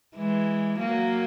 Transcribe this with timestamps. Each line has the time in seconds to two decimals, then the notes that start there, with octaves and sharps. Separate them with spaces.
0.16 E3 G#3
0.79 F#3 A#3